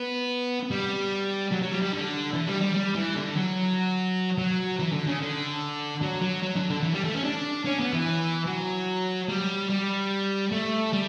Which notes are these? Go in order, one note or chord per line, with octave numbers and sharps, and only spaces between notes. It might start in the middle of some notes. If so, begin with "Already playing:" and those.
Already playing: B3
G3
F#3
F#3
G3
G3
D3
E3
G3
G3
G3
E3
D3
F#3
F#3
E3
D3
C#3
D3
F#3
F#3
F#3
D3
D3
E3
G3
A3
C#4
D4
C#4
B3
E3
F#3
G3
G3
A3
G3